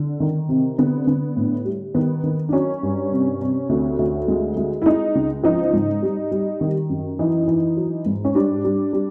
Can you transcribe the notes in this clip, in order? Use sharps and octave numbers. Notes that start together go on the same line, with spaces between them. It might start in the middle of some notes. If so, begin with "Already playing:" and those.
Already playing: D3
D#3
C3
D3 B3
D3
A2
G3
D#3 B3
D#3
D4
F#3 C#4
G2
C3
C3
D2
D2
G#3
G#3
E4
G#3 D#4
C#2
F3 D#4
G#2
G3
G3
D#3
F#2
E3 D#4
E3
F#3
G#2
C#4
G3 D4
G3
G3